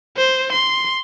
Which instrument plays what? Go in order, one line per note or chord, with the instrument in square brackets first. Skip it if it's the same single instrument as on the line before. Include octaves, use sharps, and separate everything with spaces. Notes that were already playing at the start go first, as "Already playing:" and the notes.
[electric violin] C5
C6